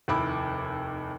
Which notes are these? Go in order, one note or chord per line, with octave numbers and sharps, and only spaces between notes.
F1 D#2 E4 B5 D6